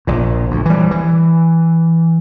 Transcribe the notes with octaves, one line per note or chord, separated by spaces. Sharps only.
A#1 A#2
D2
E3 G3
E3